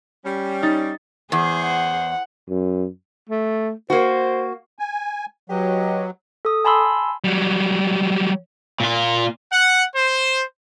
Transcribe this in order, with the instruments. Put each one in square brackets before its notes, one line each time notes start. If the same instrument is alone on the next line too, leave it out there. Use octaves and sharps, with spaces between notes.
[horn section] G3 C#4
[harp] D#4 A6
[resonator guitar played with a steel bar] E2 [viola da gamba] G#4 C5
[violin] F#5
[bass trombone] F#2
[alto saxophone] A3
[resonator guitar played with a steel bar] A#3 F#4 [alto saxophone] C5
[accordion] G#5
[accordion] F#3 [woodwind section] G4 B4 D#5
[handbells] A4 D#6
G#5 A5 B5 C6 E6
[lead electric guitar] F#3 G3
[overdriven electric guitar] A#2 F4
[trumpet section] F#5
C5